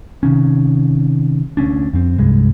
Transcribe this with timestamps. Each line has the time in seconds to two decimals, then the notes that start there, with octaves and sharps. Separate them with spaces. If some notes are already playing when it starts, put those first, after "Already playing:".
0.23 C3 D#3 C#4
1.57 D2 A3 C#4 D4
1.93 F2 C4
2.18 C2 G2 G#3